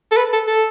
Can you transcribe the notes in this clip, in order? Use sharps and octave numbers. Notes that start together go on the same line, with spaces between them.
A4
B4
A4
A4